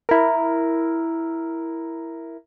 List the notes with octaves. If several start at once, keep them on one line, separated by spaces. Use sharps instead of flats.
E4 A#4